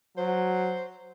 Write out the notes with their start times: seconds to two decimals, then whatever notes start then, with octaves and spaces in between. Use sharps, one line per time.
0.17 F#3 C5